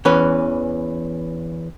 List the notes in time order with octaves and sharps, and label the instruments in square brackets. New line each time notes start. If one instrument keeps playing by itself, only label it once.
[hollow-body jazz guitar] E2 E3 C#4 B4